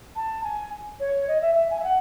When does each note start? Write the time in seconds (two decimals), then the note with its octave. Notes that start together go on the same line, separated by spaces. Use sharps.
0.15 A5
0.43 G#5
0.99 C#5
1.28 D#5
1.41 E5
1.55 E5
1.70 G#5
1.79 E5
1.84 F#5